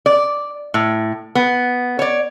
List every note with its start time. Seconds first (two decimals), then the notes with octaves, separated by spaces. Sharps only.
0.06 D5
0.74 A2
1.35 B3
1.99 C#5 D5